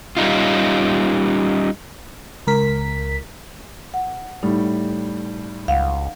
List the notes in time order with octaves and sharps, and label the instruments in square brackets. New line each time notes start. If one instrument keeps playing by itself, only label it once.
[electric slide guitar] G3 C#4 D#4 F4
[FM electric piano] C#2 A#4 B6
[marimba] F#5
[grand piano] A2 G3 [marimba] D#4
[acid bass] C#2 [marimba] F5 F#5